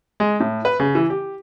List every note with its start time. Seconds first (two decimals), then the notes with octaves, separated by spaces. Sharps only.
0.20 G#3
0.40 A2
0.65 B4
0.80 C#3
0.95 E3
1.10 G4